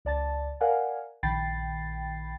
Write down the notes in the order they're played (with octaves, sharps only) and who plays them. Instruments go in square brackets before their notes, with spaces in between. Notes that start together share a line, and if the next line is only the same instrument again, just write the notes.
[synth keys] C#2 D5 A5 A6
A#4 D5 F5 F#5 G#5
A#1 D#3 G5 B5 A6 C7